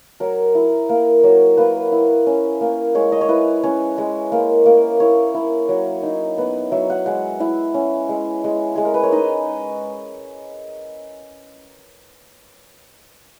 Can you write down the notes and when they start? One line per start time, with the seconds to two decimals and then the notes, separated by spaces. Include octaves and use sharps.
0.20 F#3 A#4
0.55 E4
0.89 A#3
1.23 F#3
1.57 A#3 B4
1.92 E4
2.26 C#4
2.61 A#3
2.95 G#3 C#5
3.12 D#5
3.21 C#5
3.28 E4 B4
3.63 C#4 C#5
3.98 G#3
4.32 A#3
4.66 A#3
5.00 E4 C#5
5.34 E4
5.69 F#3
6.03 D#4
6.38 B3
6.72 F#3 E5
6.90 F#5
7.06 G#3 F#5
7.40 E4 E5
7.74 C#4
8.09 G#3
8.44 G#3
8.76 G#3 G#4
8.85 A#4
8.94 B4
9.03 C#5
9.12 D#4 D#5